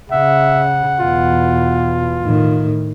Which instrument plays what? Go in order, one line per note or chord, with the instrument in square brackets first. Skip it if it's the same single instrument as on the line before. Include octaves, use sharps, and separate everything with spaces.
[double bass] C#3 [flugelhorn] E5 [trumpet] F#5
[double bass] E2 B2 [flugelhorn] F4
[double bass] A2 D#3